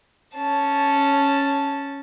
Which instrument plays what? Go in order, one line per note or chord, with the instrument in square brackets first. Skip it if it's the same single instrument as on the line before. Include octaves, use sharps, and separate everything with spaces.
[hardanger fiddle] C#4 A5